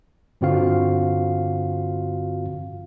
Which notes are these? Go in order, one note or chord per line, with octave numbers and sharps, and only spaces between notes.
G2 D3 C4 F4 F#4 F5